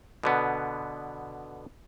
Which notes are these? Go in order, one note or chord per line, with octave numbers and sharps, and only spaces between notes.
B2 D3 B3